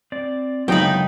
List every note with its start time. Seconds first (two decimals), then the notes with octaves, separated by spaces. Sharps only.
0.12 C4 D5
0.68 C#2 F#2 D3 B3 D#4 C5 G5 B5